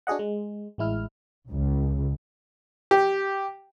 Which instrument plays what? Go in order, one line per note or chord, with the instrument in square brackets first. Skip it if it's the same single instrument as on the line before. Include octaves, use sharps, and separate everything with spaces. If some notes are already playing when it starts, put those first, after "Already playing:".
[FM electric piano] D4 F#4 G#4 D#5 F#5
G#3
A1 G#3 E4 F6
[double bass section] C#2
[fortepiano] G4